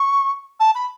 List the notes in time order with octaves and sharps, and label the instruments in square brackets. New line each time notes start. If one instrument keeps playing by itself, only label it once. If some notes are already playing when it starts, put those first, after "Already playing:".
Already playing: [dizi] C#6
A5
B5